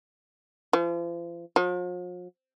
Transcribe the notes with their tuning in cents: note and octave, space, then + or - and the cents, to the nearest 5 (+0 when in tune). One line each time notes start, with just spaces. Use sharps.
F3 -40
F3 +45